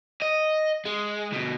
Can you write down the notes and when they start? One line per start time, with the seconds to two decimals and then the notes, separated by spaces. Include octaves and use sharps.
0.22 D#5
0.86 G#3
1.33 D2 B2